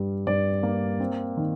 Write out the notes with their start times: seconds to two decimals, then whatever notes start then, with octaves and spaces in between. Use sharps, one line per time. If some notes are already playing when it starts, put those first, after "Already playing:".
Already playing: G2 G3
0.27 G2 D5
0.63 A#3
1.00 C4
1.37 D#3